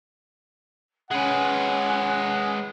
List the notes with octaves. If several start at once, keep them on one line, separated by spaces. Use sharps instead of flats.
G#3 C#4 B4 F#5